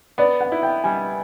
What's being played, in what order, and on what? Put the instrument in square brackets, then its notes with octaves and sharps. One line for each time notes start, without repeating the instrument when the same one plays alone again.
[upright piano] B3 [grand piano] D5
[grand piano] F#5
[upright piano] E4
[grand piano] G5
[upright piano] G3 [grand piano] G#5